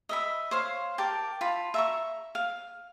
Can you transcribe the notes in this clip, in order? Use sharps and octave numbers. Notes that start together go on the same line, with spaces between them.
D#5 E5 B5
C5 C#5 F5
G4 A#4 A5
F4 A5 B5
E5 A#5 C#6
F5